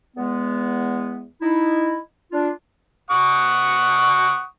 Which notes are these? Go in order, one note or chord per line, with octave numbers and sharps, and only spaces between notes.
E2 G#3 B3
D#4 E4
D4 F4
F#5 C#6 D#6